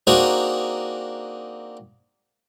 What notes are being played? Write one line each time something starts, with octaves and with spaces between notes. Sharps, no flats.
A#3 C4 D4 D#4 F#4 G#4